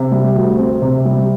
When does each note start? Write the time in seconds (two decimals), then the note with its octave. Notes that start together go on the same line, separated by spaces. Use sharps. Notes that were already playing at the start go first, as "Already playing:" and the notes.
Already playing: C3
0.12 G3
0.36 D2
0.58 C4
0.82 C3
1.05 G3